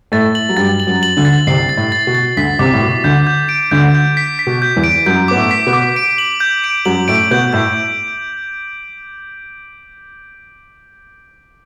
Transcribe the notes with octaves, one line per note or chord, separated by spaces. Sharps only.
A2 A3 A6
F#7
F#3
G2 G3 A6
F#7
F#2 F#3
F#7
D2 D3
A6
C2 C3 C7
A6
A2
A6
B2
A6
D2 D3 B6
C2 C3 D6
A2
B2 D6
D2 D3 G6
G6
D7
D2 D3 G6
G6
B6
B6
B2
G6
E2 E3
D7
F#2 F#3 G6
B3 D6
A2 A3
B6
B2 B3
D6
D7
F#7
G6
D7
F#2 F#3 F#7
A2 A3 D7
B2 B3 G6
A2 A3 G6